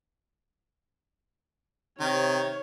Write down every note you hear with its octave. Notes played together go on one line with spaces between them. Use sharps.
C3 D#3 C#5